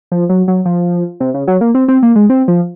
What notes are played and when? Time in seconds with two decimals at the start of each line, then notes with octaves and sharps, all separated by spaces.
0.12 F3
0.29 F#3
0.48 F#3
0.65 F3
1.20 C3
1.34 C#3
1.48 F#3
1.61 A#3
1.75 C4
1.88 C4
2.03 A#3
2.16 G#3
2.30 C4
2.48 F3